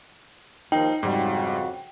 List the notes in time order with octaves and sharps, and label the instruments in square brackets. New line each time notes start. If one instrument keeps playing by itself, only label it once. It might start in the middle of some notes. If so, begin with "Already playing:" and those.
[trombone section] D#2 D#3 F3 [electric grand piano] D#4 [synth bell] G5
[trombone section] F2 C#3 F#4 [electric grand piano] G#2 G3